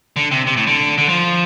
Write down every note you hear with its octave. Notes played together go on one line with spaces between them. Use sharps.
D3
C3
C3
A2
D3
D3
F3